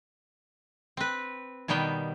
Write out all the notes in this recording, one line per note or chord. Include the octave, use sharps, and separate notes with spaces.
C4 B4
B2 D#3 G3 B3 G5